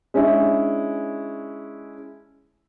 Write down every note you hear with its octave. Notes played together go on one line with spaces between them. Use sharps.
G#3 C#4 D4 E4